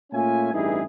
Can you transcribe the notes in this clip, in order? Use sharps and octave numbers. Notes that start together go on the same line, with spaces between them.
A#2 A3 C#4 F4 E5 G#5
A1 G2 D#4 E4 G#4